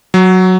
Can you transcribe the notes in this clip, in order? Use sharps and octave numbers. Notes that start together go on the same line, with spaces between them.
F#3